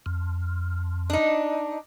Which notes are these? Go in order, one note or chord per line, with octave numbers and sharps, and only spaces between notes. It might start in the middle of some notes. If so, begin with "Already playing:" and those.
F2
D4 D#4